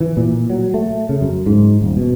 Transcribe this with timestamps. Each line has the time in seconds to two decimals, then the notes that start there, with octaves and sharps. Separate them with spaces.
0.01 E3
0.17 A#2
0.50 F#3
0.74 A3
1.09 C#3
1.21 F#2
1.46 G#2
1.81 D#1
1.97 B2